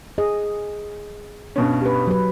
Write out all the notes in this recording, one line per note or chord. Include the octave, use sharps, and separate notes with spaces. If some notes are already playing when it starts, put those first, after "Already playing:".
G#4 D#5
G2 B2 C#4
G4 B4
F#3 B4